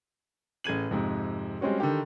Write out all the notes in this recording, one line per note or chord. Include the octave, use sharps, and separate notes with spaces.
A1 G#4 G#6 D#7 F#7
F2 G#2 C3
G3 G#3 C4 C#4 F#4
D3 D#3 G4